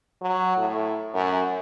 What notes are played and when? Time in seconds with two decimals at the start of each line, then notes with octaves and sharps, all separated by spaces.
0.22 F#3
0.57 A2
1.14 F#2